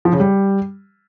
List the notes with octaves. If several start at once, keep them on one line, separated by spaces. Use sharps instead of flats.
F3
C#3
G3